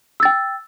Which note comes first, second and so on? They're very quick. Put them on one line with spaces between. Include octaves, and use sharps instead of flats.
E6 A6 G5